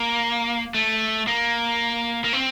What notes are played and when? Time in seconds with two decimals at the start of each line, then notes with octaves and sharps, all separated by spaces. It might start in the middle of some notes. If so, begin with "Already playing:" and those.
Already playing: A#3
0.74 A3
1.28 A#3
2.24 A#3
2.33 C4